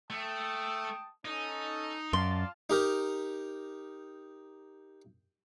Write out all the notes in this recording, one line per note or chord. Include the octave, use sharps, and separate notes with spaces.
A3 G5 A5 D#6
C#4 D#4 A4
F#2 F4 D5 F5 A5 C6
D#4 G4 A#4